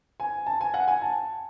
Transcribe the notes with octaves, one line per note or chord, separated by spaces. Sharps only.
G#5
A5
G#5
F#5
G#5
A5